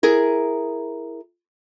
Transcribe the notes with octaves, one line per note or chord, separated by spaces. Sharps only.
E4 G#4 A#4